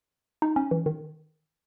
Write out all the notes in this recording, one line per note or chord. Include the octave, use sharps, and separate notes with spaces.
D#4
C#4
E3
D#3